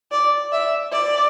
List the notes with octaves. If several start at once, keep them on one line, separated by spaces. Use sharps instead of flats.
D5
E5
D5